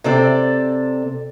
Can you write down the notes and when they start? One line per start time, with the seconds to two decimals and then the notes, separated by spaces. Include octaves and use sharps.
0.04 C3 C4 A4 D5